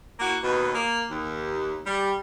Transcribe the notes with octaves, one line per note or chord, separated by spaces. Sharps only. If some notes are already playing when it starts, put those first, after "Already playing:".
A#3 E4 F#4
D#2 B2
A#3
D#2
G3